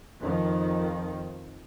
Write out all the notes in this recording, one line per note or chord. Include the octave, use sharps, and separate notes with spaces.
F2 D#3 F3